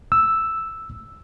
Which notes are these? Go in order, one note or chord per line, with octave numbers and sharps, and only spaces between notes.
E6